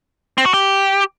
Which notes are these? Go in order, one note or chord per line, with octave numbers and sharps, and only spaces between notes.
C4
F#4
G4